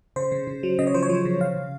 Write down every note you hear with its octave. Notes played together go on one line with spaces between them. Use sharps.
C#3 C5
C#3
C#3
F#3
C#3 D#5
C#5
F3 C5
C#5
F3
C#3
C#3 F5
C#3